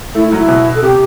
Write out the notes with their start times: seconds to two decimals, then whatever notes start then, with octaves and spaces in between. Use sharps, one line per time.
0.15 A3 E4
0.27 E4
0.32 F#3
0.38 E4
0.48 B2
0.74 A4
0.82 C3 G4